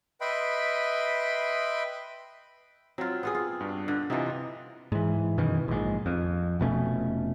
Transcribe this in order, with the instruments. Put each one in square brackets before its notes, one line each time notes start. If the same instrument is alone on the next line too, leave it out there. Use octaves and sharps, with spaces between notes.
[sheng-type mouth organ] B4 D#5 E5 G5 B5 C6
[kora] F#3 F4 [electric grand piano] C4
[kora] B3 F4 G#4
F4
[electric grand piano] G2 D4
[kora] D3
[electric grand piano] C3 F4 [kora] E3 D#4
[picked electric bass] G#2 E3
F#2 B2 D#3 E3
A#1 G#2
F2
F1 B2 A3 C#4